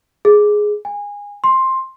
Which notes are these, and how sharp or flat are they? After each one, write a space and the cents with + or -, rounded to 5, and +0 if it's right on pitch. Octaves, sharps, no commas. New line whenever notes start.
G#4 +5
G#5 -25
C6 +10